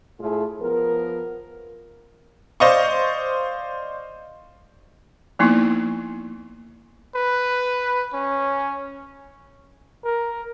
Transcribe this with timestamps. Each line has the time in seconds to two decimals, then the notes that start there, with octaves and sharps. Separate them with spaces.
0.21 A2 A3 F4 G#4
0.61 F3 B3 A#4
2.60 C5 D5 D#5 F5 C#6
5.39 F3 A#3 B3 D#4 E4
7.15 B4
8.13 C#4
10.04 A#4